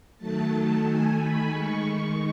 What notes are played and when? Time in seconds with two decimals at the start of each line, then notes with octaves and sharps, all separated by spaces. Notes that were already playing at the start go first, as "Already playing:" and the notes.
0.18 D#3 F#3 A3 A5
0.51 A5
0.84 D#3 A3 G#5
1.18 B5
1.50 D#3 G#3 C#6